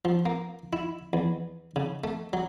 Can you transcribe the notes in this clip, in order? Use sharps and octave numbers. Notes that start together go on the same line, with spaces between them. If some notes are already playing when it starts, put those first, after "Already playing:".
F3
A#3
E4
E2
C#3
A3
F#3